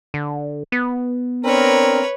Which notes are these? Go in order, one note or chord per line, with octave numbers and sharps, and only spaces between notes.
D3
B3
C4 D4 A#4 B4 C#5